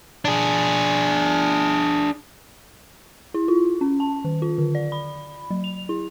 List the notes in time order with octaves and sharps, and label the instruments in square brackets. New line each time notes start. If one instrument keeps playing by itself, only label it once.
[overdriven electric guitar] D4 G#4
[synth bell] E4
F4
C#4
A5
D#3
F4
D3
D5
B5
F#3
F7
E4